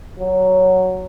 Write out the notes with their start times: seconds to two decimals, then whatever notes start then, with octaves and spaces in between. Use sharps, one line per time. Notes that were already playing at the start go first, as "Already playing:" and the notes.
0.19 F#3